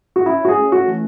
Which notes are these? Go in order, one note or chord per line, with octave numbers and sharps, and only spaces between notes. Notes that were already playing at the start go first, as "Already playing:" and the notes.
F#4
C#4 E4
F#4
G#4
A3
F#4
E3